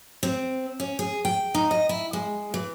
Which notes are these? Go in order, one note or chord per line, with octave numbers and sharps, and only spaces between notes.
C4
C#4
G#4
G5
D#4
D#5
E4
G#3
E3